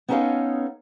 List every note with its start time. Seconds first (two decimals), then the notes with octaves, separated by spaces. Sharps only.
0.09 B3 C#4 D#4 A4 C#5 F5